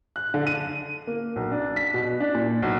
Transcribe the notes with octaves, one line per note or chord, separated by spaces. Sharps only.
F#6
D3
D#7
A#3
B1
D4
B6
B2
D4
A#2
B1